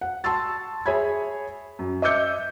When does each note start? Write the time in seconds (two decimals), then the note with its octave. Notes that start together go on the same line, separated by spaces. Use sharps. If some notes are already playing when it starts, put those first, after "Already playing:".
0.01 F#5
0.24 A5 C6 C#6 E6 A6
0.86 G#4 C#5 E5 B5 G#6
1.79 F#2
2.02 D#5 E5 D6 E6 G6 C#7